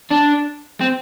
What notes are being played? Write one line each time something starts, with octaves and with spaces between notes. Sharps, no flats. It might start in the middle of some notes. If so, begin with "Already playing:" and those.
D4
C4